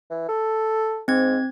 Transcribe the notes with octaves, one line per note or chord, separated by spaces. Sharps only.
E3
A4
G#2 C4 G#6